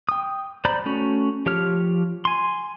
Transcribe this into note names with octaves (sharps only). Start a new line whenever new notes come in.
G5 D#6
C5 D5 A#5 B5 G6
A3 C#4 F#4
F3 G4 C#5 F6
G#5 C6